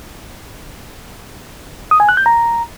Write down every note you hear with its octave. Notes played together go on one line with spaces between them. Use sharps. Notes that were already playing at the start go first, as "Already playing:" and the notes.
D#6
G#5
F#6
G6
A#5